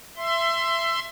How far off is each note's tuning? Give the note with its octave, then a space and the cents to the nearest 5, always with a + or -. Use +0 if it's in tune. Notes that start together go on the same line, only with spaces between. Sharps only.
E5 +20 C6 +0